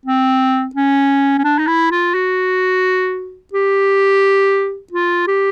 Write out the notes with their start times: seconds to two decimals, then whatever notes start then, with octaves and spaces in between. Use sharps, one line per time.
0.06 C4
0.75 C#4
1.38 C#4
1.44 D4
1.59 D#4
1.67 E4
1.91 F4
2.14 F#4
3.53 G4
4.92 F4
5.27 G4